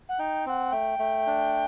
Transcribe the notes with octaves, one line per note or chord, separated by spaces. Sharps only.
F#5
D#4 G5
C4 F#5 G5
A3 G5
A3
D4